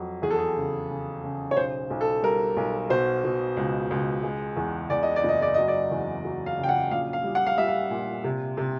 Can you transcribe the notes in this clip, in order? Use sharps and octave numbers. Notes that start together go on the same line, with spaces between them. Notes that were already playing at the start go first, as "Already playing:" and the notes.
Already playing: F2 F#3
E2 G#4
A4
G#4
C#3
C#3
C#3
C#5
B1 C5
B1
A4
G3 A#4
B1
B2 C5
B2
C#2
C#2
G#3
E2
E2 D5
D#5
D5
F#1 D#5
D5
F#3 D#5
D5
E2
F#3
F5
C#3
G5
F#5
A#1 F5
F5
G3
F#5
F5
G3 E5
F5
A#2
C3
C3